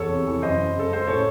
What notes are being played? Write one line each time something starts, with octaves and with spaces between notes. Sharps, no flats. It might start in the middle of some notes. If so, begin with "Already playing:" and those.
Already playing: E2 A4 C#5
C3
E3
F#2 C5 D#5
F#2
C#3 A4
G#3 C5
A2 A4 C#5